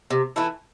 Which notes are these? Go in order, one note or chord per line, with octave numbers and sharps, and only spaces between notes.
C3
E3 A3 E4